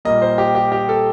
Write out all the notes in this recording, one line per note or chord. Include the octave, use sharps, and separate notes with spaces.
A#2 G3 A#3 D#5
C5
G4
G4
G4
A4